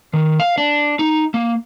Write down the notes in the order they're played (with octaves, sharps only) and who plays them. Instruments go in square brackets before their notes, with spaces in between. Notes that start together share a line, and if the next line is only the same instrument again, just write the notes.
[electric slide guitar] D#3
F5
D4
D#4
A#3